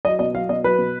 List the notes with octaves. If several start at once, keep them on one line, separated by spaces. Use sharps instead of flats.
F#3 D#5
B2 D#5
F#3 F5
B2 D#5
F#3 B4
B2